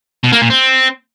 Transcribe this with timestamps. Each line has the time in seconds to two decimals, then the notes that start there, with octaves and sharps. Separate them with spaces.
0.24 B2
0.32 A#3
0.41 A#2
0.50 C4